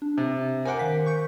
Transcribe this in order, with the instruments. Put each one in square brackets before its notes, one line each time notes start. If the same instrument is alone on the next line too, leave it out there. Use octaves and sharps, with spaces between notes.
[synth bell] D4
[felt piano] C3
[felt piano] A#4 C5 F#5 [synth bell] G#5 D6 D7
[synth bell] D#3 F5 B6
C#6 G6 C#7